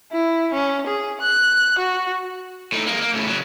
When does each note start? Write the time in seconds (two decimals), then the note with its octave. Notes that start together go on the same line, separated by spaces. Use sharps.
0.12 E4
0.53 C#4
0.87 G#4
1.21 F#6
1.79 F#4
2.72 A2 D#4
2.86 G#3 A#3
3.01 A#3
3.14 A2 C#3
3.27 C#3 F#3